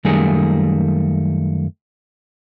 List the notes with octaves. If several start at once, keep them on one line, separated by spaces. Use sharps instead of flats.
F#2 D#3 G3 A3 A#3 G#4